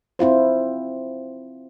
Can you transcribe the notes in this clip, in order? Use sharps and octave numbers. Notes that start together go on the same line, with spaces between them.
C4 E4 F4 C5